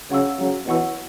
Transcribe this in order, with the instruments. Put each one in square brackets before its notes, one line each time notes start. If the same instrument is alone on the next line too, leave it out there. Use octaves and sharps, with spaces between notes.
[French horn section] C#3 F#3 [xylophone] C#5 F#5 C#6 E6
[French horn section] C#3 F#3
[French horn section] B2 E3 [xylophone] C#5 F#5 C#6 E6